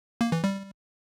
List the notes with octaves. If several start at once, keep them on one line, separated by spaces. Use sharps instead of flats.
A#3
E3
G3